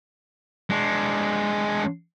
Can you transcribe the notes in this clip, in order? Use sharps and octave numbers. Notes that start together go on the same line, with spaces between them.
G#3 D4